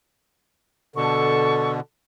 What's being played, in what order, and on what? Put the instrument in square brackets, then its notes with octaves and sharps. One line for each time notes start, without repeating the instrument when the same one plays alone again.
[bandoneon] B2 D3 [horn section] A4 [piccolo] C#6